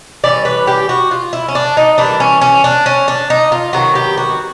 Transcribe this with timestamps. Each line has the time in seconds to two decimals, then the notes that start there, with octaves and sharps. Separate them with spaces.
0.24 E3 G3 C#4 D5
0.45 B4
0.67 G4
0.89 F#4
1.11 F4
1.33 E4
1.48 C#4
1.55 D4
1.77 D#4
1.98 E3 G3 A#3 D4
2.20 C#4
2.42 C#4
2.64 D4
2.86 C#4
3.08 D4
3.30 D#4
3.52 F4
3.73 C3 D#3 F#3 B3 F#4
3.95 G4
4.18 F#4